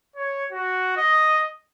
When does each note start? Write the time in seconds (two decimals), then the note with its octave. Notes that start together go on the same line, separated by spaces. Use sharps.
0.16 C#5
0.52 F#4
0.97 D#5